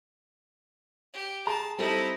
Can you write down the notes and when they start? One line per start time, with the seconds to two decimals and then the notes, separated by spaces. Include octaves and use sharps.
1.13 G4
1.47 G#4 A5 A#5
1.78 G3 C4 D#4 E4 A4